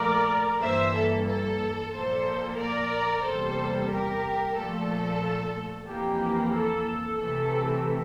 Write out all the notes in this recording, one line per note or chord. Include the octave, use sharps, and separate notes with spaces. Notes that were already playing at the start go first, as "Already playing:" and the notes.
Already playing: A#2 F3 A3 A#4 D5
G2 E3 A#3 C5 E5
A4
A4
A#2 F3 A#3 A4 C5
A#4 D5
E2 C3 G3 A#3 A4 C5
G4 A#4
A#2 F3 A3 A4
F2 E3 A#3 G4
A4
C3 E3 A3 A4